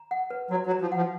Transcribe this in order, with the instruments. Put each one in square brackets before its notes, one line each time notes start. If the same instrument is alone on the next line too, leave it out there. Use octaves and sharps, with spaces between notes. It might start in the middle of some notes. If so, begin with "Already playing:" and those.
Already playing: [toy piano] A#5
F#5
B4
[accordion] F#3 [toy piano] F#4
[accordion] F#3
[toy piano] A#5
[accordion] F3
[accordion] F3 [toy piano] F#5